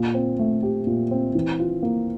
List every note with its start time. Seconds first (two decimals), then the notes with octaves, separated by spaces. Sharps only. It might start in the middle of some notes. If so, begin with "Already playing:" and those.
Already playing: A#2
0.14 C4
0.39 A3
0.63 G4
0.87 A#2
1.11 C4
1.35 E3
1.59 F4
1.82 A#3